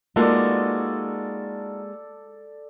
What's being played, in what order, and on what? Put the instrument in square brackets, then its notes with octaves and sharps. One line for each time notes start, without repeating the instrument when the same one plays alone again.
[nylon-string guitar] G#3 A#3 B4 [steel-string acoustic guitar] D#4 F4 F#4 [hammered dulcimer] A4 D5